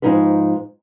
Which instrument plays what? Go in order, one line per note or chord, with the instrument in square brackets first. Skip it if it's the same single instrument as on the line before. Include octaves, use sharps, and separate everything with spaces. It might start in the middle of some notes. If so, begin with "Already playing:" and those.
[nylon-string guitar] G#2 C#3 F3 D#4 G#4 B4